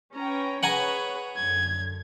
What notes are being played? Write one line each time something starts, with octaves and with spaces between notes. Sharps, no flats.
C#4 B4 G5 A#5
G#4 B4 C#5 F#5 G#5 A#5
F#2 D3 G#6